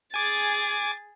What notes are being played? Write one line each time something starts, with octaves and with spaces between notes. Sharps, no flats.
G#4 G#5 D6 A6